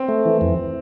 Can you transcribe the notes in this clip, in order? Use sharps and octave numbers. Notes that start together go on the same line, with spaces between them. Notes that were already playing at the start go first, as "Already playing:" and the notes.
Already playing: C4
A3
E3
F2